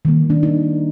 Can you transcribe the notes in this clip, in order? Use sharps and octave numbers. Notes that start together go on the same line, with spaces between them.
D#3 G3 A#3
D4
D#4